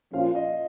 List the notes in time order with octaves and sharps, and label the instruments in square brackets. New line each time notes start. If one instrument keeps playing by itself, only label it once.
[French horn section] A#2 F3 C#4 F4 [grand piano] F5
[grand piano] D#5